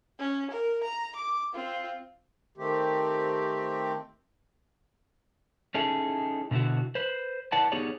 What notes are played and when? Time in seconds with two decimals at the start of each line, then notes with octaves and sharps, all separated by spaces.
0.19 C#4
0.51 A#4
0.83 A#5
1.16 D6
1.54 C4 F4
2.58 D#3 A3 C4 G4
5.75 C#4 D#4 E4 G#4 A4
6.51 B2 D3 D#4 E4 F#4
6.95 B4 C5
7.52 E4 B4 D5 F#5 A5
7.72 B3 D#4 G4 G#4 C#5 D5